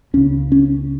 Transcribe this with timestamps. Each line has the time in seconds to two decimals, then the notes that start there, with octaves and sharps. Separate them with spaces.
0.13 C#2 C#3 C#4
0.52 C#4